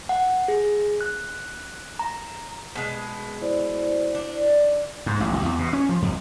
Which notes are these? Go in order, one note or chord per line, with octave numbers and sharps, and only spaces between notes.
F#5
G#4
F#6
A#5
B2 G#3
E4 C5 D5
D4
G#2
A1
C2
E2
B2
C#4
F3
F2